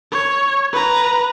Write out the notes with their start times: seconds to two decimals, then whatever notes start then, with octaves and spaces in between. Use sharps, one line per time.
0.12 C#5
0.73 B4 A#5